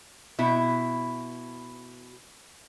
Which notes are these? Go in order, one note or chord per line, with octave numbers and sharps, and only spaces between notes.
B2 E4